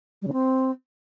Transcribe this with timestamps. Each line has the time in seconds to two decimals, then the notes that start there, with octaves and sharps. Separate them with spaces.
0.22 G3
0.27 C#3
0.33 C4